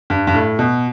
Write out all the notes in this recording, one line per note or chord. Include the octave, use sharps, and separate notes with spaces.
G2
G2
A2
B2